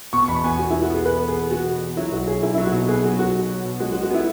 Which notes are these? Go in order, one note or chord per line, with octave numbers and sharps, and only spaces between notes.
B2 C#6
E2 B5
B3 G#5
E2 F#4
E4
E2
F#4
B3 G#4
E2 B4
B3
G#4
B3
B3 F#4
B2
E2
F#3 E4
B1 F#4
B1 G#4
B1 E4
E4
F#3
F#4
B2
B3 G#4
F#3 F#4
B2 F#4
B1
F#3
B2
G#3 F#4
F#4
G#3
F#4
B3 E4